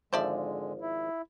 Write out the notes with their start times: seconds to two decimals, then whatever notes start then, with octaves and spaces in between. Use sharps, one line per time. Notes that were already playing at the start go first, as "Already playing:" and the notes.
0.13 G#1 D3 F3 G#3 C5 D5 E5
0.81 E4